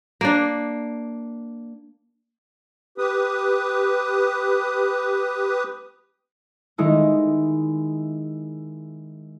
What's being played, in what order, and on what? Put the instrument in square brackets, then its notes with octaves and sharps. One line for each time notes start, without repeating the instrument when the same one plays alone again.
[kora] A#3 D4
[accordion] G4 B4 D#6
[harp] D#3 G#3 D#4 E4